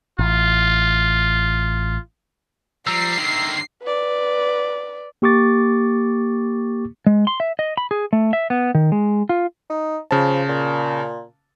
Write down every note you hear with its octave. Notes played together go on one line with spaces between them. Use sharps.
A1 F4
F3 G3 A#5 E6 C7
D3 D#3 A#4 E5
B4 D5
A#3 G4 C#6 D6 A6
G#3
C6
E5
D#5
B5
G#4
A3
E5
B3
D#3
G#3
F4
D#4
C#3 F3 A5
A#2